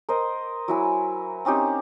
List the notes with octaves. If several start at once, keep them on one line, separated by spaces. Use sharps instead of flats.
A#4 C5 D#5
F#3 E4 G#5
C4 C#4 D#4 G4